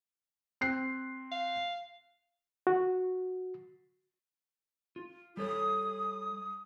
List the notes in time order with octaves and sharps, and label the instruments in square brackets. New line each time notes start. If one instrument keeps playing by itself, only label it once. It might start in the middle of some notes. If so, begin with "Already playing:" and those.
[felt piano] C4 F#6 C7
[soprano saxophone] F5
[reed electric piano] F#4
[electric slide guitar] F4
[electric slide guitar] G3 A4 C#5 [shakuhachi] D#6